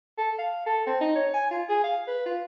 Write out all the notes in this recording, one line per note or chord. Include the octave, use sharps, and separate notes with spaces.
A4
F5
A4
C4
D#4
C#5
G#5
F4
G#4
F5
B4
F4